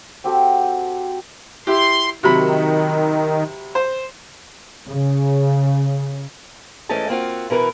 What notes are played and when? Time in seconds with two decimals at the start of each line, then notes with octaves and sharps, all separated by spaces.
0.24 C4 F#4 G4 A4
1.67 E4 G4 C6
2.23 C3 D#3 F#3 B5
3.75 C5
4.86 C#3
6.89 G#2 E3 A3 C#4 D#5 A5
7.09 A#3 C4 F4 F#4
7.50 B2 E3 A#4 B4